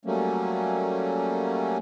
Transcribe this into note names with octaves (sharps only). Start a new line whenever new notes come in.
F#3 G3 A3 A#3 C#4